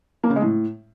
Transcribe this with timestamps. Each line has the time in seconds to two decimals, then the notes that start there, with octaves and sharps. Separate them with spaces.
0.24 A#3
0.30 C#3
0.36 G#3
0.42 A2